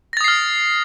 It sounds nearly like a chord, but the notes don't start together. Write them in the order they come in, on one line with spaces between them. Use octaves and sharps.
A#6 A6 D#6 C7 F6